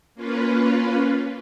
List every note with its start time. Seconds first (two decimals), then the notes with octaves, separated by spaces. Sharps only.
0.15 A#3 C#4 F4 B4